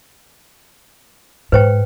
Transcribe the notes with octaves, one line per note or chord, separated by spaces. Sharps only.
G#2 B4 C5 G5